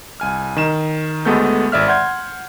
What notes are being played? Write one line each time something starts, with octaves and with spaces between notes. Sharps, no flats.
C2 G#5 F6
D#3 E7
D2 G#3 A3 B3 A4 G6
G#1 D5 E5 F6
F#5 C6 F6 G6 G#6